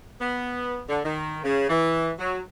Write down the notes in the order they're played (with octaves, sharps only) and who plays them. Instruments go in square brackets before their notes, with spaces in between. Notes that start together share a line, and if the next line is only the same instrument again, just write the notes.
[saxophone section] B3
D3
D#3
C#3
E3
F#3